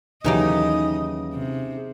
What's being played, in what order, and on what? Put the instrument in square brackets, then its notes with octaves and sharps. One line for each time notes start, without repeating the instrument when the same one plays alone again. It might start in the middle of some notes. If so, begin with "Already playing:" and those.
[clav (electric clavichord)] D#2 E3 F#3 [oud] C#3 D#4 G4 [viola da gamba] D#5
[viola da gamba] C3